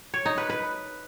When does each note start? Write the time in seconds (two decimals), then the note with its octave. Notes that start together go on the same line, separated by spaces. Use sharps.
0.14 C#5
0.26 D#4
0.38 B4
0.50 B4